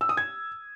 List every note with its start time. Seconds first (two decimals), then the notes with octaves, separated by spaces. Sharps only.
0.01 E6
0.09 D#6
0.17 G#6